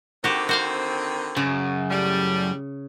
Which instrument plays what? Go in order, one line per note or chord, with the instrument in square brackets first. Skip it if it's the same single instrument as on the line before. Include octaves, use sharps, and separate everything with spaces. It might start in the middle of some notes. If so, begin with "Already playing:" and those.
[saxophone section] D3 D#3 C4 [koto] F#4 G4
[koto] F#4 C5 F5
[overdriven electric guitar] F#2 [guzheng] C#3
[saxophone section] A2 G3